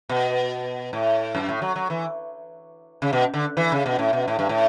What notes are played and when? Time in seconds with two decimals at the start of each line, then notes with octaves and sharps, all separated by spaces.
0.09 B2
0.93 A2
1.35 F#2
1.49 A2
1.62 F#3
1.76 F#3
1.90 E3
3.02 C#3
3.13 B2
3.34 D3
3.57 E3
3.72 C#3
3.86 B2
3.99 A2
4.13 B2
4.28 A2
4.39 G2
4.49 A2